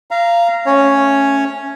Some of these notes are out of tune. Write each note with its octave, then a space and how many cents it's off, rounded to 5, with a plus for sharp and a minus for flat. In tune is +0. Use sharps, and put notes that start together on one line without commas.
F5 -20 A#5 +0
A3 +0 C#4 +0 C#5 +0